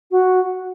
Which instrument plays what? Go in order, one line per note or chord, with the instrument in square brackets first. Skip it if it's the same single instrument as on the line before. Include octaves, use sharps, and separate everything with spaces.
[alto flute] F#4